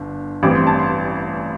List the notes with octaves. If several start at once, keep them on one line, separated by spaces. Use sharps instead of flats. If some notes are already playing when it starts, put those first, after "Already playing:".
Already playing: G1 D3
A1 G2 G3 C4 D6
C6
A5
C6